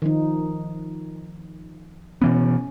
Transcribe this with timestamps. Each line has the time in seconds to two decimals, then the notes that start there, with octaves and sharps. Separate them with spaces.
0.02 D#3 F3 D#4
2.22 B2 E3 B3 C#4